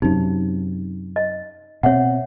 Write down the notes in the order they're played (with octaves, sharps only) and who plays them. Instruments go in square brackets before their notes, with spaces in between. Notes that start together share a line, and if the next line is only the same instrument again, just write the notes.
[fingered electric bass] F#2 C3 [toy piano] D#4
[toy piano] D#5
[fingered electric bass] B2 C4 [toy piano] C#5 E5 F#5